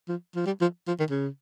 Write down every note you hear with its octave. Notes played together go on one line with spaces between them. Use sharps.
F3
F3
G3
F3
F3
D#3
C#3